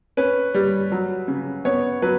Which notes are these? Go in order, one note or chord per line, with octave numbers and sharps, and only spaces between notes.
C#4 B4
G3
F#3
C#3
B3 C#5
F#3 B4